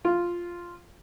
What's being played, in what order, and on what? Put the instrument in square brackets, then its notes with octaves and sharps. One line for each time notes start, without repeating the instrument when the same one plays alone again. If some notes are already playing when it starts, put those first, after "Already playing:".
[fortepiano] F4